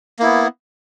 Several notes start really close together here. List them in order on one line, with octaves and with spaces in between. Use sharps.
A#3 E4 B3